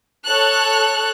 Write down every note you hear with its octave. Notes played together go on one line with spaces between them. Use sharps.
A4 C#5 F#6